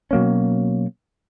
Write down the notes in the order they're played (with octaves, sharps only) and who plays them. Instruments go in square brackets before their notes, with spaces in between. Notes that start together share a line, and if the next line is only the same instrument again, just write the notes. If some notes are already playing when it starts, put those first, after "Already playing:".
[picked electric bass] B2 F#3 A#3 C#4